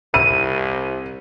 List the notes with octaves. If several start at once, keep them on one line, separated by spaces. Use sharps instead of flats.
C2 D#7